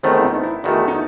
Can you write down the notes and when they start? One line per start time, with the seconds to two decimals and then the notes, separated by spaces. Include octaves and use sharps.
0.03 E2 D#3 A3 C4
0.17 E4
0.24 D#4
0.43 E4
0.64 E2 D#3 A3 F#4
0.88 D#4